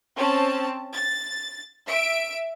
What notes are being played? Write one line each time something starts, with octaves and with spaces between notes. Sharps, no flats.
C4 C#4 A5
A6
E5 D7